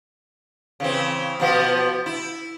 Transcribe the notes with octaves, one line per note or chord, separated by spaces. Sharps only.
C#3 E3 C4
B2 F3 B3
E4